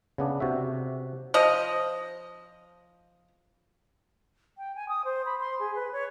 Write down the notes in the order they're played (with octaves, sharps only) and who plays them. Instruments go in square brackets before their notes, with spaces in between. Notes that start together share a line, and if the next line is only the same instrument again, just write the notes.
[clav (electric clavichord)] C#3 B3 D4
C3 F#4 E5
[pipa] F3 D#5
[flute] G5
G#5
D#6
C5
B5
C6
G#4
B4
C#5